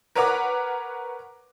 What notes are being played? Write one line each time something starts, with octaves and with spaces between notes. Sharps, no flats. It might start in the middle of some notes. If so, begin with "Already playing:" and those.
A#4 B4 C#5 F#5 A#5 D6